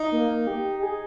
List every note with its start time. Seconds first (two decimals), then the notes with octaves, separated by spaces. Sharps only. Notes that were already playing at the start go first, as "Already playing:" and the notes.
Already playing: D#4
0.12 A#3
0.47 G4
0.75 G4
0.83 G#4